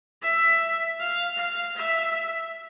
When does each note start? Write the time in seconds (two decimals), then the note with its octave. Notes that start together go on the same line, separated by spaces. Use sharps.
0.22 E5
1.00 F5
1.37 F5
1.76 E5